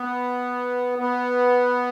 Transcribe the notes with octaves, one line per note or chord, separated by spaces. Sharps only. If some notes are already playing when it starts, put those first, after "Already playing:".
Already playing: B3
B3